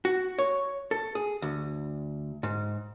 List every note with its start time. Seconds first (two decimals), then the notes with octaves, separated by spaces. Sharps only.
0.05 F#4
0.39 C#5
0.91 A4
1.15 G#4
1.42 D2
2.43 G#2